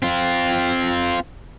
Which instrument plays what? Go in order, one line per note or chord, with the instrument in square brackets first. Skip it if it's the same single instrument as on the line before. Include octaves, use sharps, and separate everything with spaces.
[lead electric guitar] C4 F4